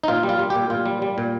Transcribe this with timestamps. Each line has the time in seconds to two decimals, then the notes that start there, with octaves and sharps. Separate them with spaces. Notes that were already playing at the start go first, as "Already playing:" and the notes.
0.04 D#4
0.08 A#2 F4
0.23 G3
0.29 F4
0.39 G3
0.50 G4
0.55 A#2
0.70 A#2 F4
0.86 G3
1.02 G3
1.18 A#2